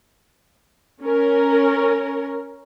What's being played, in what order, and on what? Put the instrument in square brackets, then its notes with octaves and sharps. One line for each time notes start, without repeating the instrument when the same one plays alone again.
[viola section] C#4 A#4